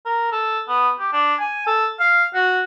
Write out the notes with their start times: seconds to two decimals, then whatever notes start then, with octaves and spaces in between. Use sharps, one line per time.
0.05 A#4
0.32 A4
0.68 B3
0.99 G4
1.13 D4
1.39 G#5
1.67 A4
2.00 F5
2.34 F#4